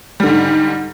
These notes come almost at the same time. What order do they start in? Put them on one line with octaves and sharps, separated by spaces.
G3 D3 G#2